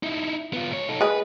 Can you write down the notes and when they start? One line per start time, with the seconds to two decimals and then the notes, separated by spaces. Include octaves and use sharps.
0.03 D#4 E4
0.53 B3 F4
0.71 G#2 C#5
0.89 D#4 A4
1.01 G#3 G#4 B4